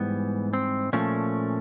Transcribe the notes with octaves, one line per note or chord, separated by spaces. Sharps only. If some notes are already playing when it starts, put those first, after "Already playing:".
Already playing: G#2 E3 G3 B3
C4
A#2 F3 A3 C#4